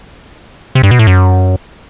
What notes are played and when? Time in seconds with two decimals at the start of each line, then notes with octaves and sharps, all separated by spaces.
0.75 C3
0.83 G2
0.91 B2
0.99 A2
1.07 F#2